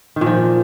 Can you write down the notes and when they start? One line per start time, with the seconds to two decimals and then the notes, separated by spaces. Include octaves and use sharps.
0.16 D#3
0.21 A#2
0.26 F3